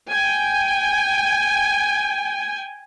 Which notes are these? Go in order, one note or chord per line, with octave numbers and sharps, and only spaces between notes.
G5 G#5